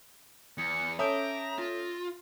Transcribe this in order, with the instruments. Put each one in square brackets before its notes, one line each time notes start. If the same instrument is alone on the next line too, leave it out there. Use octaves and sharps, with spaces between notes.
[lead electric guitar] E2 [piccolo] C#7
[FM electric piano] C#4 A4 G6 [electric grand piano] E5 D#6 [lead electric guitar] A#5 [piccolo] D6
[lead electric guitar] F4 [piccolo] A#6